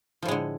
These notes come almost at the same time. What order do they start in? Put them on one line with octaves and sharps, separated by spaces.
F3 A2 G#3 D3